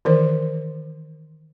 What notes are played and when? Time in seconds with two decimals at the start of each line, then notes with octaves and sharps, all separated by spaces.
0.05 D#3 E3 A#4 C5